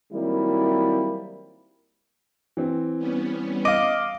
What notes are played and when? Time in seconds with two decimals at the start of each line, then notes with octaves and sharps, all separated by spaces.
0.13 D#3 F#3 G3 A#3 C4 E4
2.57 E3 C4
2.98 G3 B3 C#4
3.65 D#5 F5 D6